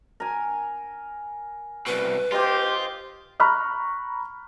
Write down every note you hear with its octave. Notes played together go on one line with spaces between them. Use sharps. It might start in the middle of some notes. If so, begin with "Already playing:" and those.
A#4 G#5
C2 B2 B4
F4 G4 C5 D#5 C6
A#5 B5 C#6 F6 F#6